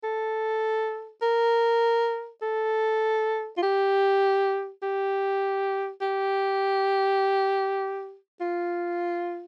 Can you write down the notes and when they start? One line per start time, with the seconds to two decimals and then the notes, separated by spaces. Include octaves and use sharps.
0.03 A4
1.22 A#4
2.42 A4
3.57 F4
3.62 G4
4.82 G4
6.01 G4
8.41 F4